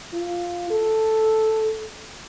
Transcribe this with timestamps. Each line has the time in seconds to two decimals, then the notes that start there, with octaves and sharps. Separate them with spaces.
0.13 F4
0.70 A4